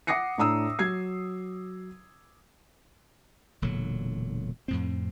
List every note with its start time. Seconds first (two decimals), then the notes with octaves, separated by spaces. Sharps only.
0.07 F#5 D6 D#6 A#6 C7 C#7
0.38 A2 D4 A#5 D#6 E6
0.79 F#3 G#6 C7
3.62 E1 A#2 D3 F#3
4.68 F2 A2 C4